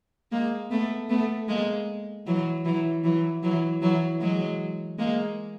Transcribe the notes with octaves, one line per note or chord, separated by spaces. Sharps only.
G#3 A#3
A3 B3
A3 B3
G#3 A#3
E3 F#3
E3 F#3
E3 F#3
E3 F#3
E3 F#3
F#3 G#3
G#3 A#3